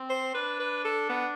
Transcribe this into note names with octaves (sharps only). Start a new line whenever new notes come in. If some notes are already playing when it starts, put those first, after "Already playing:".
Already playing: C4
C5
D4 B4
B4
A4
B3